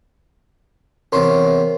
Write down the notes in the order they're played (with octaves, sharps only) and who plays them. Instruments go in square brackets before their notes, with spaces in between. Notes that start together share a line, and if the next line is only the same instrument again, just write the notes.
[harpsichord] E2 C3 C#4 [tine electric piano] A#4 C6